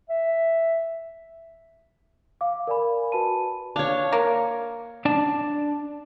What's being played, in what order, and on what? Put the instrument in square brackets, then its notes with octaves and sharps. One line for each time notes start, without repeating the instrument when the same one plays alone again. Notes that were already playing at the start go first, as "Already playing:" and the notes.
[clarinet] E5
[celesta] F5 D6
A#4 D5 G#5 B5
F#4 B4 A5 B5 D#7
[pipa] D4 [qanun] C#5 F5
[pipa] A#3
[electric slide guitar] D4 D5 A5